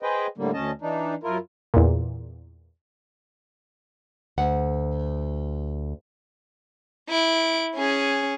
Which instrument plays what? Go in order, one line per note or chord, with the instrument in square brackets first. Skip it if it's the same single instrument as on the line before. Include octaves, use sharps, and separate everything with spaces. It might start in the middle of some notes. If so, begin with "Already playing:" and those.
[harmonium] G#4 B4 C5 D#5 G5
A2 D3 G3 A#3
D2 C#4 D#5 A5
E3 D4 D#4
F#2 E4 F4 A#4
[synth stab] E2 A#2
[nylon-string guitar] D2 F#5
[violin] E4 D7
C#4 G#4